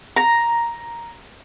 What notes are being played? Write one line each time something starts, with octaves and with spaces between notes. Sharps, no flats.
A#5